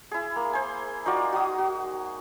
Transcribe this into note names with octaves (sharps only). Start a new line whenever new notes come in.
E4 G#4
A#3
C5 G#5
D#4 F4 F#4 D5
F#4 D#6
F#4